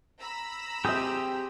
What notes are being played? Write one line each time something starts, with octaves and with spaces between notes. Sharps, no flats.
A#5 B5 E6
C4 G4 G#4 E5 D#6